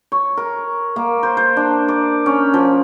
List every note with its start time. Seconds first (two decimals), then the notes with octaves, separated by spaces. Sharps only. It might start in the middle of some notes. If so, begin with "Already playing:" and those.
0.12 C#5
0.37 A#4
0.96 A#3
1.23 C5
1.37 C5
1.57 D4
1.88 D5
2.26 C#4
2.54 F3